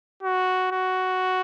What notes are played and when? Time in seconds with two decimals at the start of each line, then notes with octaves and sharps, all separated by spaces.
0.23 F#4
0.71 F#4